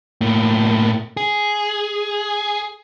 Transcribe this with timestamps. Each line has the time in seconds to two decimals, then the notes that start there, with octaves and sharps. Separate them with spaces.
0.21 A2 A#3
1.17 G#4